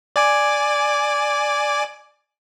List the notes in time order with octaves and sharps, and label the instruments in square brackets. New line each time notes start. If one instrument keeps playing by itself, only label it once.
[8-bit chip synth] D5 G#5 D6